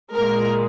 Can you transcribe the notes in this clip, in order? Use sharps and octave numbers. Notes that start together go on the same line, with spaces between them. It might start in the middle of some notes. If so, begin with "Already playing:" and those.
A#2 G#3 A#4